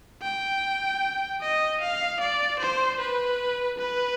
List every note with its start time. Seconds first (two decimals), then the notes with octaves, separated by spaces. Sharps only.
0.22 G5
1.41 D#5
1.81 F5
2.21 D5
2.60 C5
3.00 B4
3.78 B4